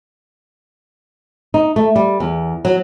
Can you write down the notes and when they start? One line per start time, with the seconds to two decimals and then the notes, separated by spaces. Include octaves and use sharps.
1.54 D#4
1.76 A3
1.96 G3
2.20 E2
2.65 F#3